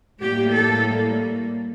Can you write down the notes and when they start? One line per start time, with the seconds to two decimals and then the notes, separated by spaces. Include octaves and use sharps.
0.21 A2 G3 A#3 G4
0.53 A4